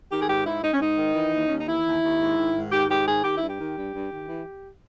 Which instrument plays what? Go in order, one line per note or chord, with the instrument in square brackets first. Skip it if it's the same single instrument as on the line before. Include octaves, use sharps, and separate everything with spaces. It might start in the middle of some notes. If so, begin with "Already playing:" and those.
[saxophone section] D#3 G4
G#4
G#2 G4
G#2 E4
G#2 D#4
C#4
G#2 D#4
D#3
E3
D#2
D#2 C#4
D#4
E3 E4
D#2
D#2
G#2
D#3
G#2
D#3 G4
G#2 G4
D#3 G#4
D#3 G4
E4
G2
G4
D#3
G2
G2
D#3
E3